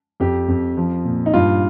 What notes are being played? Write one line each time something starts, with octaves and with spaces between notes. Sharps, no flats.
F2 G4
F2
F3
A#2
D#4
G2 F4